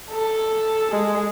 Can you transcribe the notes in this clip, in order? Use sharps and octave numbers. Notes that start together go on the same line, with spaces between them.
A4
G#3